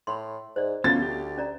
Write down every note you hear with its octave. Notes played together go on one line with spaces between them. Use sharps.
A2 B5 C6
G#2 C5 D5
D2 B3 C#4 F4 A6
G4
C#4 D5 A#5